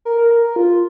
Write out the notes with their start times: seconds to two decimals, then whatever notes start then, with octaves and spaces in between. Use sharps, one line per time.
0.05 A#4
0.18 A#4
0.31 A#4
0.44 A#4
0.56 F4